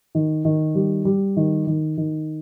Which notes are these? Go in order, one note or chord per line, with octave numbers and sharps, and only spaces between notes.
D#3
D#3
G3
G3
D#3
D#3
D#3